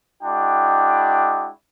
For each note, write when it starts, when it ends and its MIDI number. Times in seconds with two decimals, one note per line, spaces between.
0.23 1.50 56
0.23 1.50 62
0.23 1.50 64
0.23 1.50 66
0.23 1.50 79
0.23 1.50 86